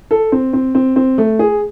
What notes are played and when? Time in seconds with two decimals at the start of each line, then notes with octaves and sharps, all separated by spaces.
0.11 A4
0.32 C4
0.53 C4
0.75 C4
0.96 C4
1.18 A3
1.39 G#4